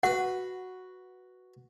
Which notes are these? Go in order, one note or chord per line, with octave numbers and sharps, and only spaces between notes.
F#4 B4 F#5